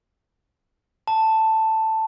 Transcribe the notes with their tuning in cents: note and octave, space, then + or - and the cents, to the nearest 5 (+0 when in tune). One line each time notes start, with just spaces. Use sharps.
A5 +5